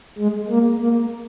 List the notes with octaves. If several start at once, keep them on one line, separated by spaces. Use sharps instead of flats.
G#3
A#3
A#3